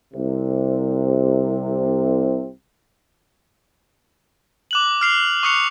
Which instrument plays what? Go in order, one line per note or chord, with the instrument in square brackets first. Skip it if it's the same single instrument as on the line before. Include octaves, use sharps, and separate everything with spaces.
[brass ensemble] C2 C3
[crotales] D6 F#6 F#7
F6 C7 F7
C#6 D#6 F#6 C7 C#7 F7